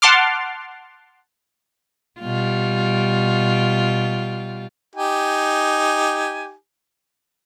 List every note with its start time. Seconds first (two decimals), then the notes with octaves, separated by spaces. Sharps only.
0.02 F#5 A5 C6 D6 F6
2.20 B2 G3 F4
4.95 D#4 G4 G#5